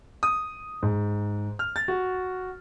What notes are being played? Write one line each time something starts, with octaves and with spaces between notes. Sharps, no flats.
D#6
G#2
F6
A6
F#4